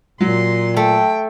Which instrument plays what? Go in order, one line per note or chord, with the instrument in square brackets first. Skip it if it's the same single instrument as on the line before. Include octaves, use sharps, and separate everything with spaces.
[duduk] A#2 [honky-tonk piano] F#3 [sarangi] C6
[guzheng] A3 [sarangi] G5